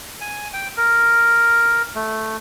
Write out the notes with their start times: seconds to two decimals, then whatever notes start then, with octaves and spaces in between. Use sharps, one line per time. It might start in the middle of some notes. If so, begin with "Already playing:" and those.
0.21 G#5
0.53 G5
0.77 A#4
1.95 A3